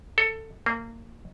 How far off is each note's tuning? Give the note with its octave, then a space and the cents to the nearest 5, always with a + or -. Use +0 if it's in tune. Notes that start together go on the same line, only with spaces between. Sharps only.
A4 +15
A#3 -25